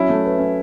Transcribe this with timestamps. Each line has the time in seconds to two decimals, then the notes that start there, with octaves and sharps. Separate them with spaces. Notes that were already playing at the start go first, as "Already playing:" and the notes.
Already playing: F#3 C#4 E4
0.09 A3
0.24 B4
0.39 C#4